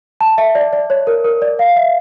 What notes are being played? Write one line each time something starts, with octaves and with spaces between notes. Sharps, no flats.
A5
E5
D5
D5
C#5
A#4
A#4
D5
F5
E5